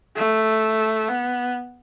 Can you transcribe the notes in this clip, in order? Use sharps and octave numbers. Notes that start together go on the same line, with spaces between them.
A3
B3